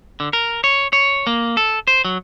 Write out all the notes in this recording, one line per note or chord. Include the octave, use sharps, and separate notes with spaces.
D3
A#4
C#5
C#5
A#3
A4
C5
F#3